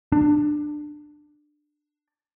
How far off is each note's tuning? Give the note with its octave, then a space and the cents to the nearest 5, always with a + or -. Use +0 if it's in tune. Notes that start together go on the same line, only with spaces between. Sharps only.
D4 +20